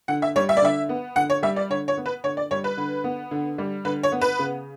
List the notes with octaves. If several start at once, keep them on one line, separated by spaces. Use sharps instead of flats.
D3 F#5
E5
G3 C#5
E5
D5
D3 E5
B3
D3 F#5
C#5
G3 E5
D5
D3 C#5
C#5
B3
B4
D3 C#5
D5
G3 C#5
B4
D3
B3
D3
G3
D3 B4
C#5
B3
B4
C#3